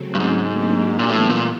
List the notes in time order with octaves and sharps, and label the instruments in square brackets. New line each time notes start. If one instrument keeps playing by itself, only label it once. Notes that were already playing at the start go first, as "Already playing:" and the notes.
Already playing: [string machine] C#3 F#3 A3 C4
[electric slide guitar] G2
G#2
[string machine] F#3 A#3 D4 G4
[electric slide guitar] A#2
[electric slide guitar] A2 [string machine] E3 G3 B3
[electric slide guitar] A#2